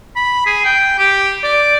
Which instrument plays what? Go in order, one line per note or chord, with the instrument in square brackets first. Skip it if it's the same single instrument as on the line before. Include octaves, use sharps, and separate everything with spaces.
[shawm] B5
G#4
G5
G4
D5